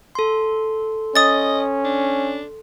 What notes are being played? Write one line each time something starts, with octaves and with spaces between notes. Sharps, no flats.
A4 C6
C#4 D#5 D#6 A6
D4